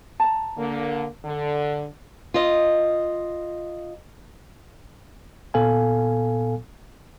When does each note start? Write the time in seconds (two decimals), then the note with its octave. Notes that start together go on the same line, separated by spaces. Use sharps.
0.20 A5 A#5
0.58 D3 A#3
1.25 D3
2.34 F4 D#5
5.54 A#2 B3 A4 F5 G#5